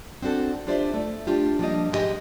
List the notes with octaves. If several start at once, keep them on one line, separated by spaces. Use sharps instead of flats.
C4 D4 F#4 A4
D4 F4 G4 C5 D5 E5
A3
D4 F4 G4
F3 G3 A#3 D4 G4 D#5
G#2 G#3 E4 G4 D#5